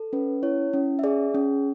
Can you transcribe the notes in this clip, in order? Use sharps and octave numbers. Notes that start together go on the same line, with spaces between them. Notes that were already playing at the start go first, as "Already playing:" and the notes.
Already playing: A4
C#4 B4
E4 C#5
C#4
E5
G#4 D5
C#4